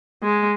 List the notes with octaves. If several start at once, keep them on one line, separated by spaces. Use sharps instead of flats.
G#3